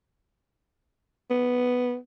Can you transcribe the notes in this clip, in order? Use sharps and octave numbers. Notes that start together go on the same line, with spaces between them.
B3